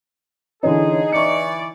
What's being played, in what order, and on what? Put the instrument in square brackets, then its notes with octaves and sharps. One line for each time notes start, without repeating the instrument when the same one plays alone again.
[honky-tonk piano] D3 E3 C#4 [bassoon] D#4 [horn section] G#4
[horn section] E3 D5 [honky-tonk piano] C#6 C#7